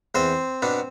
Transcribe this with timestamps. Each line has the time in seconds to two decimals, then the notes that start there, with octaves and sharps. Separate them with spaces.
0.15 E2 C4 C5
0.62 B2 B3 D4